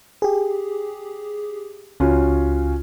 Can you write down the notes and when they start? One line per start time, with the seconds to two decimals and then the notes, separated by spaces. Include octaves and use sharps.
0.22 G4 G#4
2.00 C#2 C#4 F4 F#4